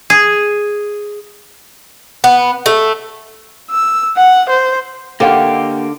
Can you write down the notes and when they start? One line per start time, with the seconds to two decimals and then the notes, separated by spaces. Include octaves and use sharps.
0.10 G#4
2.24 B3
2.66 A3
3.71 E6
4.17 F#5
4.49 C5
5.20 D3 A#3 G4 F5 F#5